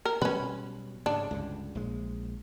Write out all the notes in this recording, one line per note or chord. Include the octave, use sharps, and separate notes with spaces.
A#4
B2 F#3 G3 C#4 B4
G#2 C#3 D4
C#2 G2 D3
A#1 G#3